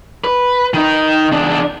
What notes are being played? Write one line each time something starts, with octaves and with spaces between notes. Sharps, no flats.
B4
D#3 D#4
E2 D4